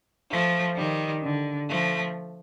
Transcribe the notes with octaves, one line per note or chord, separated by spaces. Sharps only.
F3 A3
D#3 G3
D3
F3 A3